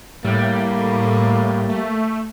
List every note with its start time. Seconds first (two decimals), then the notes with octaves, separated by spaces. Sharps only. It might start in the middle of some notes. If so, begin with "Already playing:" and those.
0.25 A2 G3 A#3
1.69 A3